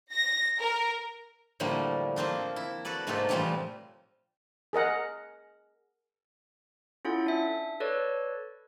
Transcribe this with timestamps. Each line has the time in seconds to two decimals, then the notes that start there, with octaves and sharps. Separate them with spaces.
0.12 A#6
0.59 A#4
1.60 A2 D3 F3 G3 A3 A#3
2.16 F3 A#3 C4 D4
2.56 E4
2.85 F#4 A4 B4 D5
3.07 G#2 C3 A3 A#3 F4 A4
3.29 A2 E3 F3 G3 A3
4.73 G#4 A#4 D#5 F#5
7.05 C#4 E4 F4 A4 F#5
7.26 D4 E5
7.80 A4 B4 C#5 D5